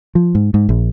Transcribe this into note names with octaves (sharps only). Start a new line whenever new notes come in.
F3
G#2
G#2
A#1